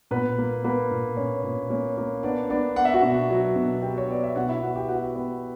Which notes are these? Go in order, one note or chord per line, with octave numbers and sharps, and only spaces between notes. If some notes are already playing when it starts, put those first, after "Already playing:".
A#2 B3 B4
A#3
A#3 B3 B4
A#2
A#2 C#4 C#5
A#2
A#3 C#4 C#5
A#3
B3 D4 D5
B3 D4 D5
B3 F#5
E5
F#4 F#5
B2
F#3
B2
B3 G4 G5
C#5
B3 D5
E5
B2 F#4 F#5
E4 E5
B3 F#4 F#5
G4 G5
B3 F#4 F#5
B3